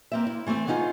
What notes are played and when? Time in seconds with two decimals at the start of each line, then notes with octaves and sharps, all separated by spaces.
0.12 A#3 C4 E5
0.27 E4
0.47 E3 A3 A#3 C4
0.67 B3 C#4 D#4 F4 G#4